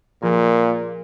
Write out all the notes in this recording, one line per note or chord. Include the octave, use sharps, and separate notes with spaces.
A#2 F3 G#4 A#4